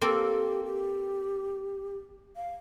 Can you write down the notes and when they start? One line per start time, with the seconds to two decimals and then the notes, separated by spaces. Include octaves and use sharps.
0.01 A#3 C4 G4 A4
0.65 G4
2.36 F5